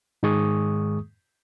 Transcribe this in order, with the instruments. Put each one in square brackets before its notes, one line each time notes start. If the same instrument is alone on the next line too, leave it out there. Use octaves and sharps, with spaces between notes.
[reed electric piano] G#2 D#3 G#3 G#4 C#6 D#6